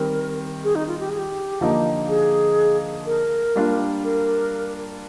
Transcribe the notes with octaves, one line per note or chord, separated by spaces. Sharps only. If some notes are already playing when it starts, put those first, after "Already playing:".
Already playing: D#3 G3 C4 A#4
G#4
D#4
F4
G4
G#4
G4
D3 F3 A#3 D#4
G#4
A#4
G3 A#3 D4 F4
A#4